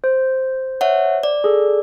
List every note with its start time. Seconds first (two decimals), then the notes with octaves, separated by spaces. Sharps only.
0.04 C5
0.81 C#5 E5 F#5
1.23 D5
1.44 G#4 A4